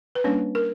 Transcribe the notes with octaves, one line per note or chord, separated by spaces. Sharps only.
B4
G3 A#3 C#4 D4 C#5
A#4